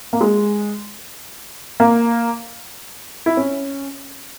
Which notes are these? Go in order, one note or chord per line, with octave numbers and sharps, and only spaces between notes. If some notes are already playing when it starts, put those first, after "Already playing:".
A#3
G#3
A#3
E4
C#4